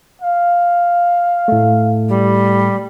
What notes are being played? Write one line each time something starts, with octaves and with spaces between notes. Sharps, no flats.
F5
A2 A3
G3